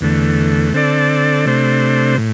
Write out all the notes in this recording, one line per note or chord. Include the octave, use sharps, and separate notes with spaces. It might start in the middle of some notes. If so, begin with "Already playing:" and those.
E2 D3 A3
D3 C4 A4 D5
C3 A3 D4 C5
A2